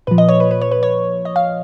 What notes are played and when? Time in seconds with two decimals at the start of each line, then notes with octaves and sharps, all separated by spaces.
0.07 A#2 F3 B4
0.18 D#5
0.29 C#5
0.40 B4
0.51 B4
0.62 C#5
0.71 B4
0.83 C#5
1.25 D#5
1.36 F5